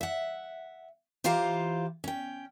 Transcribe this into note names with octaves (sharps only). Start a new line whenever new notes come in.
E5 F#5
E3 F4 G4 C5 F5 A#5
C#4 G5